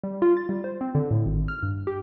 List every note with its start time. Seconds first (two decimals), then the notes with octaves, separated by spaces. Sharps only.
0.03 G3
0.22 F4
0.37 A6
0.49 G3
0.64 C5
0.81 C4
0.95 D3
1.11 A2
1.25 G#1
1.48 F6
1.63 G2
1.87 G4